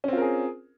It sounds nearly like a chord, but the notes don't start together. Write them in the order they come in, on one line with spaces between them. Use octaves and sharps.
C#4 C4 F4 A#4 G#4